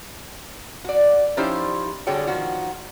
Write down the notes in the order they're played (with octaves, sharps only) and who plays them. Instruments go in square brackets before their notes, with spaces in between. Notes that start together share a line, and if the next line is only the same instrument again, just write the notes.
[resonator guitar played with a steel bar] F#4 D5
F3 C#4 D#4 E4 G4 C5
D3 G3 F#4 G#4 C#5 G5
D#3 F3 F#4